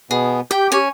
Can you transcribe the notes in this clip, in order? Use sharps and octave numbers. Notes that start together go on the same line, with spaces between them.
B2 B3 G#4
G4 G5 G6
C#4 C#5 G#5